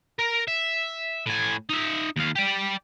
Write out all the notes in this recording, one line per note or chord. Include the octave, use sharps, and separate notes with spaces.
A#4
E5
A2 G#5
D#4 E5
D#2 F5
G4 D5